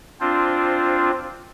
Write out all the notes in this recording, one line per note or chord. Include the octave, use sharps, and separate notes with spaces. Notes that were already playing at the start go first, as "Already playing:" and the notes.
C4 D4 F4 C5